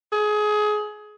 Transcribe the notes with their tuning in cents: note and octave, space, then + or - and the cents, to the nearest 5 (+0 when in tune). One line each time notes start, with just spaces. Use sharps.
G#4 +25